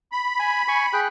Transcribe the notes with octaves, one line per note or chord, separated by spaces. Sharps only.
B5
G#5
G#5 C#6
G#4 G5 F#6